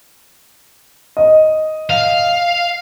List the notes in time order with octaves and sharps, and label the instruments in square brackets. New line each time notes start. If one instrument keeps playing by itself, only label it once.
[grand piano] D#5
[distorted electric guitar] F5